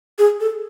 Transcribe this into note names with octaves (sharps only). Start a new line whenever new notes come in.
G#4
A4